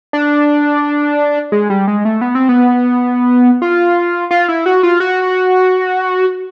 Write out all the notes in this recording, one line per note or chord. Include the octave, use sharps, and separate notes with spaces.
D4
G#3
G3
G#3
A3
B3
C4
B3
F4
F4
E4
F#4
F4
F#4